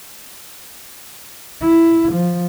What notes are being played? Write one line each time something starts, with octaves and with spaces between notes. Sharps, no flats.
E4
F3